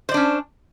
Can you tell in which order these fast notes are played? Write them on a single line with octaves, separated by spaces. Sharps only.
C5 D5 D4 C#4